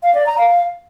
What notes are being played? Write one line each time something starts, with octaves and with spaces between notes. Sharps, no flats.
F5
D5
A#5
F5